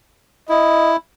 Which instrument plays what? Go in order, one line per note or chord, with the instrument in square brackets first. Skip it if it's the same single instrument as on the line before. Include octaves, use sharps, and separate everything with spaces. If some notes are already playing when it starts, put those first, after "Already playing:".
[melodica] E4 [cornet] D#5